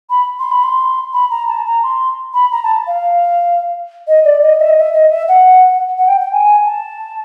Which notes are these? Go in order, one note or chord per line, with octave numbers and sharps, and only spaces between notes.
B5
C6
B5
C6
B5
A#5
A5
A#5
C6
B5
A#5
A5
F5
D#5
D5
D#5
E5
D#5
E5
D#5
E5
F#5
F#5
G5
G5
G#5
A5